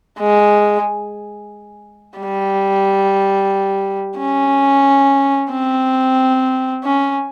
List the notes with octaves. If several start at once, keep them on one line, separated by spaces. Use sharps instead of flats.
G#3
G3
C#4
C4
C#4